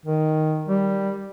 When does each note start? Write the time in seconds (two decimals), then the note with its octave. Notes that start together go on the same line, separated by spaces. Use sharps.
0.05 D#3
0.68 G3